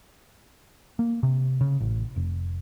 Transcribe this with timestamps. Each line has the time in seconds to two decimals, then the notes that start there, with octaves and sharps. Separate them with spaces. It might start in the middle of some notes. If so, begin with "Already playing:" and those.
0.99 A#3
1.23 C3
1.61 C#3
1.80 A1
2.16 F1